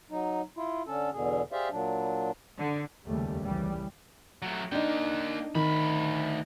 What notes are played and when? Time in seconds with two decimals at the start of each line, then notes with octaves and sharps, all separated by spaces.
0.11 F#3 D#4
0.57 E4 F4
0.87 D3 C#4 A4
1.12 E2 B2 D3 G#4
1.52 G4 G#4 C5 D5 E5 F5
1.72 A#2 F#3 D4
2.58 D3
3.05 F1 D#2 C#3 G3 A3
3.44 C2 C#3 E3 G3
4.42 F#3 A3
4.72 A#3 D4 D#4 G5
5.55 D2 D#3 B5